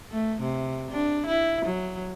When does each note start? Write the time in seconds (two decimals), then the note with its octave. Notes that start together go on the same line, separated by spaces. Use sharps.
0.11 A3
0.41 C3
0.91 D4
1.26 E4
1.65 F#3